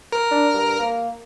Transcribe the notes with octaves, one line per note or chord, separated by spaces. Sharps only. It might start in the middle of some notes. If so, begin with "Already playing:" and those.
A#4
D4
G2
A#3